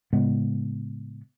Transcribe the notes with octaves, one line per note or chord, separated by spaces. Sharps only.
A2 C#3 G#3 B3